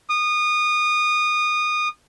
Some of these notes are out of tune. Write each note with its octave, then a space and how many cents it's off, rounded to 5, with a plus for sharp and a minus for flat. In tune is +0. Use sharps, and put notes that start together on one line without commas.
D#6 -25